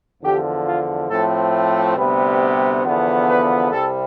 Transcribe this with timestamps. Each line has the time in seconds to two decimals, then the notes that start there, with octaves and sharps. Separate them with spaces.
0.22 E2 D3 F3 G4
0.66 F4
1.10 A2 F3 A3 C4 A4
1.97 D2 C3 G3 B3 B4
2.85 E2 D3 F3 B3
3.28 B4
3.72 C2 C3 G3 A4